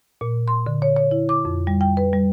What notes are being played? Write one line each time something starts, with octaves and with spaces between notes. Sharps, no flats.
A#2
C6
D3
C#5
C#5
E4
D6
F2
G3
G5
B4
G3